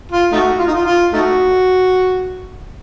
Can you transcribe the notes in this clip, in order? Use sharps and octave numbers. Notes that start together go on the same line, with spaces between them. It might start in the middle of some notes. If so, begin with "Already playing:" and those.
F4
A3 D#4 F#4
F4
D#4
F4
F4
A3 D#4 F#4